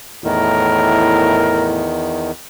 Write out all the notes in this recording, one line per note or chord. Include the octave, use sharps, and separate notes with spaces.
E2 A2 D#3 A#4